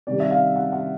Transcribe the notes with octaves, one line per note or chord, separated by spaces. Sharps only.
C3 D#3 G3 D5
E5
F5
F#5
F#5